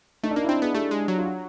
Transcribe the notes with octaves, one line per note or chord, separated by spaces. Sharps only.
A3 D#4
D4
A#3 D#4
E4
C4 D#4
B3 G#4
A3 G4
G#3
F#3
F4
F#4